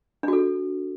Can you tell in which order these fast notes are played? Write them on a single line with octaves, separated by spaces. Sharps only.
D4 F#4 A4